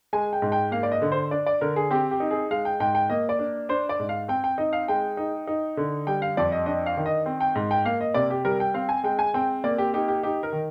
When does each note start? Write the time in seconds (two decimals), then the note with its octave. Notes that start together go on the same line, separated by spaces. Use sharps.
0.13 G#3 G#5
0.33 G5
0.42 G#2
0.52 G5
0.72 A#3 F5
0.83 D5
0.92 D#5
1.02 D3
1.12 C5
1.31 D4 D5
1.46 D5
1.61 D3 A#4
1.76 G#4
1.91 C4 G4
2.11 G4
2.20 D#4
2.31 G#4
2.51 G#3 F5
2.65 G5
2.80 G#2 G5
2.95 G5
3.10 A#3 D#5
3.29 D5
3.39 D4
3.69 D4 C5
3.89 D5
3.99 G#2
4.09 F5
4.28 C4 G5
4.44 G5
4.58 D#4 D#5
4.73 F5
4.88 G#3 G5
5.17 D#4
5.47 D#4
5.77 D3
6.07 G3 G5
6.22 F5
6.37 F2 D5
6.52 D#5
6.66 D4 D#5
6.86 F5
6.97 D#3
7.06 D#5
7.26 C4
7.40 G5
7.55 G#2
7.71 G5
7.85 A#3 F5
8.01 D#5
8.14 C3 D5
8.30 G4
8.45 G3 A#4
8.60 G5
8.74 C4 F5
8.89 G#5
9.04 G#3 G5
9.19 G#5
9.34 C4 G5
9.64 A#3 D5
9.78 G4
9.94 D#4 G4
10.08 G4
10.23 D#4 G4
10.43 A#4
10.53 D#3